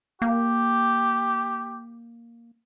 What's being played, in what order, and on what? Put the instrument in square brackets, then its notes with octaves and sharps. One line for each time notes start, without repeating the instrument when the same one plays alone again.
[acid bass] A#3 [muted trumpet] G4